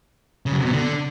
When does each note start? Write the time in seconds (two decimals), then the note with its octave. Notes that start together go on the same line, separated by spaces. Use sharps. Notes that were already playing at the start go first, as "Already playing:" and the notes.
0.46 C#3
0.52 F#2
0.59 C3
0.65 B2
0.71 D3